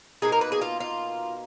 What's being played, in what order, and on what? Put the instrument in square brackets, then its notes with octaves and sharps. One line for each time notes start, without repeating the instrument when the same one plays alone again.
[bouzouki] B2 A#3 D#4 G#4
A#4
B4
G#4
F4
F4